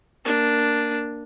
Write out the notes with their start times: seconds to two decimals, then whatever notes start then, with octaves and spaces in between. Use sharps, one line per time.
0.25 A#3 D4